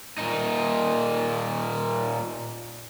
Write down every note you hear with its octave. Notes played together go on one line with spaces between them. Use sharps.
A#2 D#4